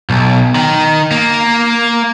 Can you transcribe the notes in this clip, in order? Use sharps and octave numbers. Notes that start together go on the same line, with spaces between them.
B1
D#3
A#3